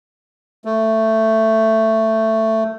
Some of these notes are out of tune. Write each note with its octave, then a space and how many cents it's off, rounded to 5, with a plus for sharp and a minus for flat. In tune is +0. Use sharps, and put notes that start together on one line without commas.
A3 +10